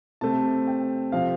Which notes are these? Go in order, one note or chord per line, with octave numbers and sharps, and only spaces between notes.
C3 A3 C4 A5
G5
C3 F3 C4 F5